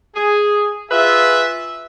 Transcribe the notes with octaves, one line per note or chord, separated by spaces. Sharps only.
G#4
F4 G#4 B4 E5